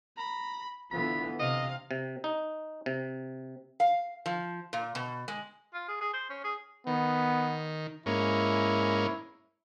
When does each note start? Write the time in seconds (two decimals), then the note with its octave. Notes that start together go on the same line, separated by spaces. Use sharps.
0.17 A#5 B5
0.91 D3 E3 B3 F4 B5
1.39 C3 D#5 F5
1.91 C3
2.24 D#4
2.86 C3
3.80 F5
4.26 F3
4.73 A#2
4.95 B2
5.28 G#3
5.74 F4
5.88 G#4
6.01 G#4
6.13 C5
6.30 C#4
6.44 G#4
6.87 D#3 B3
8.06 G#2 A#3 C#4 E4